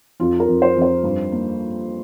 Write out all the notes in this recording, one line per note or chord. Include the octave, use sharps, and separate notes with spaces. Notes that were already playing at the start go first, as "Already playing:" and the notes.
F2 F4
A#4
F2
C5
F2
C5
G2
A#3